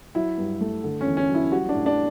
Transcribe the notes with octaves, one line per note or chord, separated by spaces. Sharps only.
F#3 E4
G2
A3
D3
C#4
E2
C#4
F#3
E4
G3 F#4
D4
A2
D4